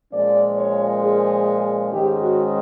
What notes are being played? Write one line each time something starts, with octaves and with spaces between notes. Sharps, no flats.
A#2 F3 G#3 C#4 D5
C#5
G#4
G#2 D#3 G#3 C#4 G4
F#4